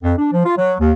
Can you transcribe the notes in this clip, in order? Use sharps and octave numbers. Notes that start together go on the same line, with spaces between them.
F2
D4
F3
F4
F#3
D#2